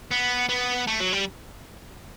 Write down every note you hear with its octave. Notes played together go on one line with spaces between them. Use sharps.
B3
B3
A3
F#3
G3